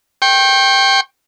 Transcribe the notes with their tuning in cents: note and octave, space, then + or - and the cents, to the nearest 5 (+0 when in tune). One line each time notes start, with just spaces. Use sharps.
G5 +0 C#6 -40